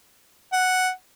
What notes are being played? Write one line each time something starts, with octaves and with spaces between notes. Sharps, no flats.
F#5